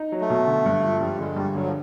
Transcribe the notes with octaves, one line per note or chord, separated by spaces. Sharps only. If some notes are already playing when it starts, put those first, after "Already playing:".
Already playing: D#4
F#3
A3
B2
D3
G2
F3
G2 G3
D3 G#3
G2 G3
D3 F#3
F3